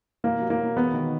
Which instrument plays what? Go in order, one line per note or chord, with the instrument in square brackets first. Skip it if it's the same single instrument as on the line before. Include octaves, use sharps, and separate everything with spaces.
[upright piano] B2 [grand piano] A#3
[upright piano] F#3
[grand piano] A#3
[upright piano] B2
[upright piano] E2 [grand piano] B3
[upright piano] D#3